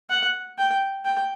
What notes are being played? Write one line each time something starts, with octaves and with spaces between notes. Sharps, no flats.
F#5
G5
G5